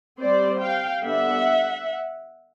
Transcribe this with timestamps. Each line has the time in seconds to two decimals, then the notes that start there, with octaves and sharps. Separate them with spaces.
0.20 G3 C4 C5 D5
0.62 F5 G5
1.03 D3 G3 B3 D4 E5 F#5